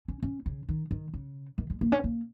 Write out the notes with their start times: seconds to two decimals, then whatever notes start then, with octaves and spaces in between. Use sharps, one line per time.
0.08 C#4
0.23 C#4
0.46 C#3
0.69 D#3
0.91 D#3
1.14 C#3
1.58 D#3
1.70 G#3
1.81 A#3
1.92 C#4
2.04 A#3